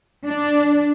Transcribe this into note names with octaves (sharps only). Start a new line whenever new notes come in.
D4